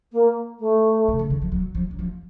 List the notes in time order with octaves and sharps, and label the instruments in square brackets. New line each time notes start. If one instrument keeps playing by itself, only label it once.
[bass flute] A#3
A3
[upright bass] C3
C#3
D#3
F3
F#3
F3
F#3
F3